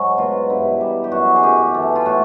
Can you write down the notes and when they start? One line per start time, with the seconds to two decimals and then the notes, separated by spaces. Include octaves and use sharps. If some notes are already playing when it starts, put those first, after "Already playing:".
Already playing: G#2 F#3
0.18 B2 F4
0.50 G2 E4
0.81 G3
1.04 G4
1.12 F#2 F#4
1.36 G#4
1.43 F#2 G4
1.74 E3 A4
1.95 F4
2.05 A2 F#4